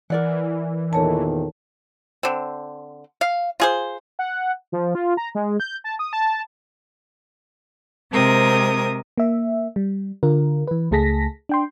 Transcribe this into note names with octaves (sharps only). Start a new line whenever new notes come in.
E3 A#4 D5 F#5
E2 A#2 D#3 A4 C#5 A5
D3 C4
F5
F4 G#4 C5
F#5
F3
F4
A#5
G#3
G6
A5
D#6
A5
C3 G#3 C4 A#4 D#6
A#3 E5
G3
D3 F4 A#4
E3 B4
C#2 A3 G#4 A5 A#6 B6
D4 G5 C6